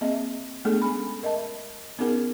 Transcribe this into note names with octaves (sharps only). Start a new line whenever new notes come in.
A#3 C4 G#4 D#5 E5
G#3 A3 B3 D4 G#4 A4
C#4 G#5 B5
A#4 D#5 E5 A5
B3 C#4 D#4 G#4 A#4